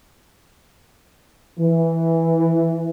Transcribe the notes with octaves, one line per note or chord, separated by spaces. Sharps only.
E3